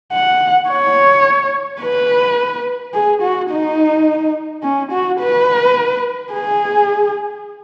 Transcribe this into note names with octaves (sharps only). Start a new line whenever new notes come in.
F#5
C#5
B4
G#4
F#4
D#4
C#4
F#4
B4
G#4